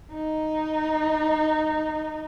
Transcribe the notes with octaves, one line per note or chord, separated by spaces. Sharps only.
D#4